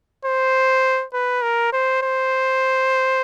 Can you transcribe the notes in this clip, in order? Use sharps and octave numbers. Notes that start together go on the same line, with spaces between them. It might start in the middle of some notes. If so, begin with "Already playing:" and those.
C5
B4
A#4
C5
C5